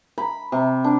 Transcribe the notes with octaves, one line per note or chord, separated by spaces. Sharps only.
B5
C3
D4